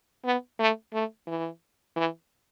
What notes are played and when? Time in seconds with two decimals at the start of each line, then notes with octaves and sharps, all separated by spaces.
0.24 B3
0.59 A3
0.93 A3
1.27 E3
1.96 E3